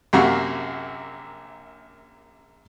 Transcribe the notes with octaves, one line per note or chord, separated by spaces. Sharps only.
A#1 F#2 C3 A#3 F#4 C#6